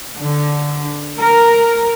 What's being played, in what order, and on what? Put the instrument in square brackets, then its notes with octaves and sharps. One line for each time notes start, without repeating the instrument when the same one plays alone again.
[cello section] D3
A#4